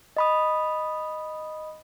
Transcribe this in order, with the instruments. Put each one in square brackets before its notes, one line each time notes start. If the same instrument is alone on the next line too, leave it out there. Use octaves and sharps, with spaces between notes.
[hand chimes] D#5 B5 D#6